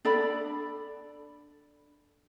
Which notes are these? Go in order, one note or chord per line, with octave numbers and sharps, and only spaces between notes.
D4 A4 D5 B5